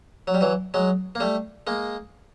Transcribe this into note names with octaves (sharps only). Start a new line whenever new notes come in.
F#3
G3
E3 F#3
F#3 G#3
A#3
G3 A3
G#3 A#3